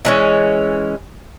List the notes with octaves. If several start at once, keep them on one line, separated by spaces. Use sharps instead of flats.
E3 G#3 C#4